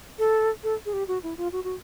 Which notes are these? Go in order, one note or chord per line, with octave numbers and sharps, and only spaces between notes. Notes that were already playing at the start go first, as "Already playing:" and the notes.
A4
A4
G#4
G4
F#4
E4
F4
F#4
F#4